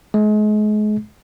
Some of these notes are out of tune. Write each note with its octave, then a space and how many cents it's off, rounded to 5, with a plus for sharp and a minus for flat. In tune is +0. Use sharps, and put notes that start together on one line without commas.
G#3 +35